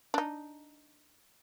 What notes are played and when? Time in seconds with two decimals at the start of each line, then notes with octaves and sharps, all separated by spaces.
0.14 D4 D#4